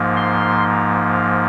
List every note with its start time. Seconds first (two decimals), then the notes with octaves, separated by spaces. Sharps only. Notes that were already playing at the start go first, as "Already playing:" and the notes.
Already playing: G#2 F3 A#3
0.16 C6